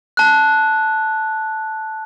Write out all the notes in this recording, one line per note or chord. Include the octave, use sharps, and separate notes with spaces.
A5 F#6